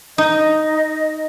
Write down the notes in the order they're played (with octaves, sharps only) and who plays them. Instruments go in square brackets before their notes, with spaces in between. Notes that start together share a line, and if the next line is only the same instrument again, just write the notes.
[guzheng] D#4 [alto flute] D#5